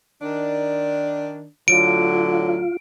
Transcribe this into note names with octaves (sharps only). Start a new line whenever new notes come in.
D#3 D4
A2 D3 F#3 F4 D7